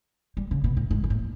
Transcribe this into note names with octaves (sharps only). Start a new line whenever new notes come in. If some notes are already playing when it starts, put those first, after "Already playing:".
G3
C#3
B2
A2
G#2
G#2
A2